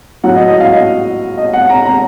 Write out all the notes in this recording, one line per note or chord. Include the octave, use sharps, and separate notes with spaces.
A2 F#3 F#5
D#5
D#5
F5
D#5
D#5
F#5
A#5
A#5